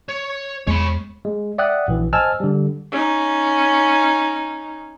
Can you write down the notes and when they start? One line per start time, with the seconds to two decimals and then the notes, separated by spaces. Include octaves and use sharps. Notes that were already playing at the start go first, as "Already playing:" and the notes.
0.09 C#5
0.67 E2 G#3 C#5 B5
1.25 G#3
1.58 D5 E5 F#5 G5 D#6 F#6
1.88 A#1 E3
2.13 C5 D#5 G#5 A5 E6 F6
2.40 D3 G3
2.92 C#4 D#4